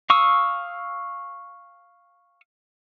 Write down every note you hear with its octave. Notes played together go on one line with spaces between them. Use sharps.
F5 C#6 D#6 E6